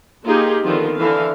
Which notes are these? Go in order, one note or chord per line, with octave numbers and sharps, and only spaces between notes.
A#3 D#4 F4 G4 G#4
D3 D#3 F3 B3 C4 F4
D3 E3 F5